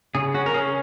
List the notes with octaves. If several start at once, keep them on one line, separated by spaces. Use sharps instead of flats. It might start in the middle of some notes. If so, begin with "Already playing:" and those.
C#3 G#4
C#4 F#4
A#4
C#4 G#4